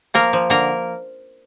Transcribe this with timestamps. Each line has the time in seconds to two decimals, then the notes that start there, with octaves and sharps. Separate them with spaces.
0.14 F3 A#3 A#4
0.33 F3
0.50 D3 A#3 A#4